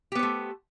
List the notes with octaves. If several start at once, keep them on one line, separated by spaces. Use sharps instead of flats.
A3 B3 G4 C5